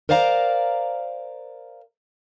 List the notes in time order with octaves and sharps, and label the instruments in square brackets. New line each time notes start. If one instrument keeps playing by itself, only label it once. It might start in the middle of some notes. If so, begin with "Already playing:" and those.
[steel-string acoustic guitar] A#4 C5 D5 F5 G#5 A#5